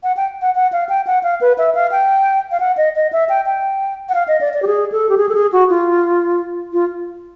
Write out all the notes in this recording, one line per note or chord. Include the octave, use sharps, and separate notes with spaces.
F#5
G5
F#5
F#5
F5
G5
F#5
F5
B4
E5
F5
G5
F5
F#5
D#5
D#5
E5
G5
G5
F#5
F5
D#5
D5
D5
G4
G#4
A4
G4
G#4
A4
G#4
F#4
F4
F4